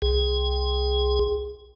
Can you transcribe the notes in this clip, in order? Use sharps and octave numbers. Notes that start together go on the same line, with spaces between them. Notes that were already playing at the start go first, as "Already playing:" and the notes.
C2 G#4